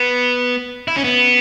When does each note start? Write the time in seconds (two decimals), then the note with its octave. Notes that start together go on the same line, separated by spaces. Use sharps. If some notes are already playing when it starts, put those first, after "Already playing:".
Already playing: B3
0.88 E4
0.96 C#4
1.04 B3